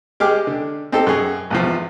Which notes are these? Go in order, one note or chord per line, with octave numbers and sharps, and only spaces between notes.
G#3 G4 G#4 D6 F6
D3
C4 D#4 G4 A4
F#2 G#4
G#1 E2 F3